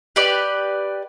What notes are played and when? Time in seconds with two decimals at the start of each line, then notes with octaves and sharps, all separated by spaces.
0.16 G4 B4 D5